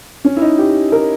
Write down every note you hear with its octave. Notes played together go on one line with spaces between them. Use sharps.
C#4
E4
D#4
G4
A#4